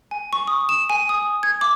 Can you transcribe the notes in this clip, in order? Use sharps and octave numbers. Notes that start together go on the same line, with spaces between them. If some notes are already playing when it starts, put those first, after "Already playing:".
G#5
C#6
D#6
E7
G#5
D#6
G#6
D6